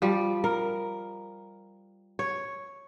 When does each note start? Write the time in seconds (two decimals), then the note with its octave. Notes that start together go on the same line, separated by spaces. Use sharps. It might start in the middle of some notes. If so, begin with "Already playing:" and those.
0.02 F3 G3
0.44 A#4
2.19 C#5